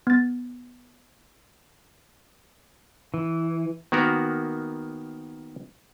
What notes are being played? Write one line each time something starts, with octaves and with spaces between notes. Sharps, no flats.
B3 A6
E3
D#3 A#3 B3 F#4 A#4